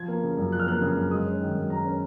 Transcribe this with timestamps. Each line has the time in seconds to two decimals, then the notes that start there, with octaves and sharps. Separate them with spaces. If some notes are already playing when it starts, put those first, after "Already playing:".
Already playing: F3 G#6
0.08 A#3
0.23 C#3
0.37 F#2
0.52 F3 F#6
0.60 F6
0.67 A#3 F#6
0.81 C#3
0.96 F#2
1.11 G#3 D#6
1.25 C#4
1.40 D#3
1.55 F#2
1.70 G#3 A#5
1.85 C#4